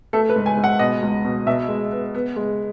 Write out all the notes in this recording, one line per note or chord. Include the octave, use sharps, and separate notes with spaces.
A3 A4
B4
G#2
G#5
G#2
F#5
B2 D#5
C#2
B2
B2 E5
G#3
B3
B3
G#3